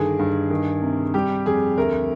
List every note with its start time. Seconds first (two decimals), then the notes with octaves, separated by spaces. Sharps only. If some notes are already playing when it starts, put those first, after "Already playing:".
Already playing: G2 D3 D#3 G#4
0.19 G2
0.50 D#3
0.82 C3
1.14 G3 G4
1.46 F2 G#4
1.77 D2 A#4